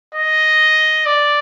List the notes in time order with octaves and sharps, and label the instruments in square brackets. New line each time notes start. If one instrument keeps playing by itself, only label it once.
[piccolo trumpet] D#5
D5